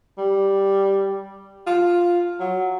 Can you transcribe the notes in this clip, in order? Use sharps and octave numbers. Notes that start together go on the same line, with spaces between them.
G3
F4
F#3